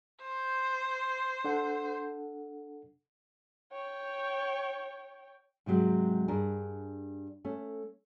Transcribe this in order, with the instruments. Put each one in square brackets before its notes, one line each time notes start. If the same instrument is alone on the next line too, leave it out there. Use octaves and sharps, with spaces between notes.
[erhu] C5
[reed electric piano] D4 A4 F#5
[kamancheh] C#5 G5
[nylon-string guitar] G#2 C3 F#3 G#3 C4
G2 D4 G#4 A#4
A3 C#4